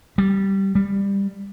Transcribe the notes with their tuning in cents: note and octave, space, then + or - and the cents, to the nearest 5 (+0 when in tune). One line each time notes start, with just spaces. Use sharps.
G3 -10
G3 +15